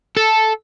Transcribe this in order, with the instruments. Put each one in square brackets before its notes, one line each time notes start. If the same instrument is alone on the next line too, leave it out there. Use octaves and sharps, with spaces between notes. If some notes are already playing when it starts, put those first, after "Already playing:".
[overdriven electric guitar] A4